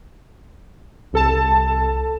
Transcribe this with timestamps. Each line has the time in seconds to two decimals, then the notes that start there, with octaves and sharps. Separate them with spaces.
1.13 C2 A4 A5